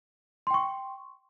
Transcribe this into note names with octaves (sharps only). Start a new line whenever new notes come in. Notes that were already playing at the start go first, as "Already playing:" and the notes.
G5 C6 C#6